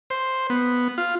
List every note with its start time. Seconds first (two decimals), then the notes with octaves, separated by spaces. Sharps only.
0.10 C5
0.50 B3
0.98 F4